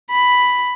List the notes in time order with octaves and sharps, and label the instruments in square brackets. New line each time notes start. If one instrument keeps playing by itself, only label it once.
[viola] B5